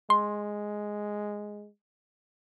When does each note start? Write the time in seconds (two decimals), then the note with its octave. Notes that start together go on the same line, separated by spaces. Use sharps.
0.10 G#3 C6